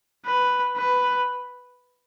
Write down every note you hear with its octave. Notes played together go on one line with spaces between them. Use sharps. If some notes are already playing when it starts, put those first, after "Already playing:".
B4
B4